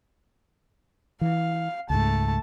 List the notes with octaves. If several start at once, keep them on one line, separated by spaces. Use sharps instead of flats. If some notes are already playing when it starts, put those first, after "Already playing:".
E3 F5
C#2 G#2 A3 A5